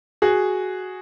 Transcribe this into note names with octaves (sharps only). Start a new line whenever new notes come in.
F#4 G#4